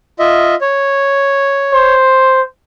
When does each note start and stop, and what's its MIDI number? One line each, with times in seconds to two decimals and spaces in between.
0.19 0.55 65
0.19 0.55 75
0.19 0.55 76
0.61 1.94 73
1.73 2.42 72